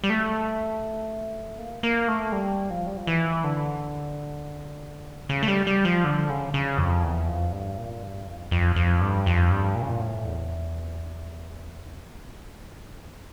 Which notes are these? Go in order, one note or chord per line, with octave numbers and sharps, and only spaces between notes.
G3
A3
A#3
A#3
A3
G3
F3
G3
F3
E3
D3
C#3
A3
G3
G3
F3
D3
C#3
C#3
F2
E2
F2
G2
A#2
G2
F2
F2
F2
G2
F2
G2
A#2
C#3
A#2
A2
E2